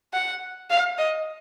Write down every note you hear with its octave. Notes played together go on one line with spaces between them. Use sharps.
F#5
F5
D#5